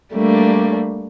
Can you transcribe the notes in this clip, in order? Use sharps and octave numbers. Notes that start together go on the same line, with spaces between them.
G3 A3 A#3 D4